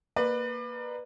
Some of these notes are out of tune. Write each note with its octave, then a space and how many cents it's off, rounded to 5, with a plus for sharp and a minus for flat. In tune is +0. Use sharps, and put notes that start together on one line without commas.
A#3 +0 B4 +0 D5 +35